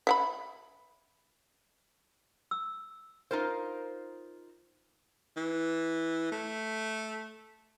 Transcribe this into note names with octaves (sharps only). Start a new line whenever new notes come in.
E5 F#5 B5
E6
D#4 F4 A#4 C5
E3
A3